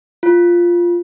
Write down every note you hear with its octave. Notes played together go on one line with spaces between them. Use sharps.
F4